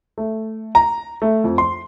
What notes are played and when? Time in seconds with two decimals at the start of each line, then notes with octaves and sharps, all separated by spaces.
0.18 A3
0.75 A#5
1.22 A3
1.44 F2
1.58 C6